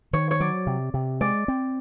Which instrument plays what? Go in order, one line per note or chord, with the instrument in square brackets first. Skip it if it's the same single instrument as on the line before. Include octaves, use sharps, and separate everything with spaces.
[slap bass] D#3 [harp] C#5
[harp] C#5
[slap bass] F#3 [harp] D5
[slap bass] C3
C3
[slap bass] G#3 [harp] D5
[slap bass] C4